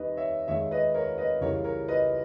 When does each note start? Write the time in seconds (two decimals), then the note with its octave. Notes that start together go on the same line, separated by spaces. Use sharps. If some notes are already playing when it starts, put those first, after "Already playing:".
Already playing: D#2 D#3 G3 B4 D#5
0.17 C#5 E5
0.48 D#2 D#3 G#3 C#5 E5
0.71 B4 D#5
0.94 A#4 C#5
1.18 B4 D#5
1.41 C#2 C#3 E3 G3 A#4 C#5
1.64 A#4 C#5
1.88 B4 D#5